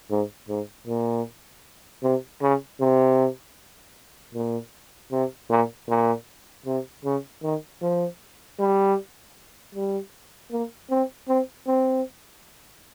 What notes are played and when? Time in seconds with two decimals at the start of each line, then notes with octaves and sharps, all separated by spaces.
0.11 G#2
0.49 G#2
0.87 A#2
2.03 C3
2.42 C#3
2.80 C3
4.34 A#2
5.12 C3
5.50 A#2
5.89 A#2
6.66 C3
7.04 C#3
7.43 D#3
7.82 F3
8.59 G3
9.75 G3
10.52 A#3
10.90 C4
11.29 C4
11.67 C4